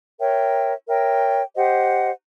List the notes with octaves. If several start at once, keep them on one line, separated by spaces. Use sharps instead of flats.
A#4 C#5 E5 G5
A#4 C#5 E5 G5
G4 C5 D#5 F#5